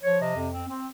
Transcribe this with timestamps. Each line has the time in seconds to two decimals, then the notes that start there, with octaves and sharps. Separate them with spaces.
0.03 F3 C#5
0.20 C3 D#5
0.36 F2
0.53 C4
0.69 C4